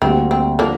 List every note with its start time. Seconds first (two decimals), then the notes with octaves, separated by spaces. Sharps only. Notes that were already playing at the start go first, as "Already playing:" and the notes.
0.02 D2 D3 G3 A#3 C4
0.31 C4
0.59 D3 F3 A#3 D4